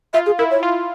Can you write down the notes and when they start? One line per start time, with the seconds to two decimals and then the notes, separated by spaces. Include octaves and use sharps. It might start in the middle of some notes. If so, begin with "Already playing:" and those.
0.13 F4 E5
0.26 G#4
0.39 E4 A#4
0.51 C#5
0.63 F4